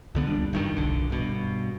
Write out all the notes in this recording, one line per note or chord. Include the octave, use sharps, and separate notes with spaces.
C#2 D3 B3
D#1 G3 D4
F#1 G2 D#3
D#1 B1 D3
G2 B2